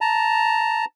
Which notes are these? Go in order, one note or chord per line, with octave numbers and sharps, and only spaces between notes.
A5 A#5